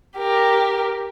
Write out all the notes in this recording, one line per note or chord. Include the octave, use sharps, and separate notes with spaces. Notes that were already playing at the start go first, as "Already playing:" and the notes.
G4 A#4